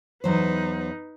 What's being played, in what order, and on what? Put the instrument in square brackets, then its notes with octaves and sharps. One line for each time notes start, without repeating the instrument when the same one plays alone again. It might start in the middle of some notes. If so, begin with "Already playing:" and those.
[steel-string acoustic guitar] E2 F#3 C5 [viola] D#4 B4